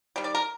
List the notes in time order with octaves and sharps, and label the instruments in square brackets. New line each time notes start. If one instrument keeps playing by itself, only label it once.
[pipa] D#3 G3
D5
A#4